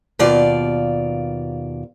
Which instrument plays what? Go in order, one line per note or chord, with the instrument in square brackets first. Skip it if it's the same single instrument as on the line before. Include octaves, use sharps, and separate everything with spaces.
[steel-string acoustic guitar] D#2 B2 F4 D5 F5